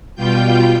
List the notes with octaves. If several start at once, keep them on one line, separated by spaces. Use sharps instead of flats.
B2 G3 F4 G5 G6